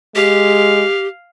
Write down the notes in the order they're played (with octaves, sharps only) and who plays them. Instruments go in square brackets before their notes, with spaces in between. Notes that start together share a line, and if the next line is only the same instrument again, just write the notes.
[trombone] G#3 [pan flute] G4 [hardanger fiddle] F5